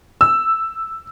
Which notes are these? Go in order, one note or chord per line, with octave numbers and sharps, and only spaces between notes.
E6